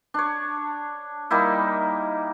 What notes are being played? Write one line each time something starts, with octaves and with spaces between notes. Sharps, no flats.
D4 C#5
G3 A#3 D#4 E4